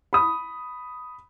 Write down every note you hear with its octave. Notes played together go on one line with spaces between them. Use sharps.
B5 D#6